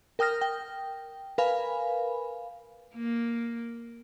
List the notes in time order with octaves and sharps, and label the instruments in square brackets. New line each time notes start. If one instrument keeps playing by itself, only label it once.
[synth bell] A#4 G5 D#6 F6 A#6
G5
A#4 B4 F5 G#5 B5
[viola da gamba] A#3